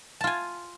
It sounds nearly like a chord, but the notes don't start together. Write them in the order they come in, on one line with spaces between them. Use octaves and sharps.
A5 F4 G#5